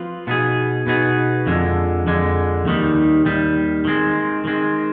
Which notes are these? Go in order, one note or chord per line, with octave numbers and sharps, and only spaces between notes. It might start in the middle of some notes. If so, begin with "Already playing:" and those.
Already playing: F3 C4 F4 B4
B2 B3 D#4 G#4
B2 B3 D#4 G#4
F2 D3 G#3
F2 D3 G#3
D#2 D#3 G3
D#2 D#3 G3
D#3 G#3 C4
D#3 G#3 C4